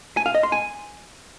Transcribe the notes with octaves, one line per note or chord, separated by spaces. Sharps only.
G#5
F5
D#5
C6
G#5